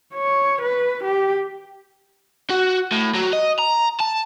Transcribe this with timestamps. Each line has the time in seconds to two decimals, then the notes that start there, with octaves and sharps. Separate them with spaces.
0.14 C#5
0.62 B4
1.04 G4
2.51 F#4
2.92 A2
3.14 F#3
3.33 D#5
3.59 A#5
4.00 A5